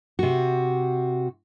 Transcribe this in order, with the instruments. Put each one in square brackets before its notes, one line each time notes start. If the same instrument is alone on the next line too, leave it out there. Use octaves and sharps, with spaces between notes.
[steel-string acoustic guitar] C3 F#4